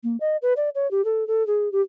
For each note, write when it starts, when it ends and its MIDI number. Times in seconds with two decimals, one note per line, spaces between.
0.04 0.17 58
0.20 0.37 75
0.42 0.53 71
0.57 0.69 74
0.75 0.90 73
0.91 1.04 67
1.05 1.27 69
1.27 1.46 69
1.47 1.71 68
1.72 1.81 67